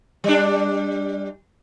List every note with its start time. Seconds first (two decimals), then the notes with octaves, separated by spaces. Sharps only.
0.24 G3 D4